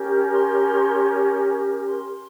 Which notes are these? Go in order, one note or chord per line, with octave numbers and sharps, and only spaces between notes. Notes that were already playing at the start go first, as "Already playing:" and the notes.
Already playing: C#4 G4 A#4
C6
C6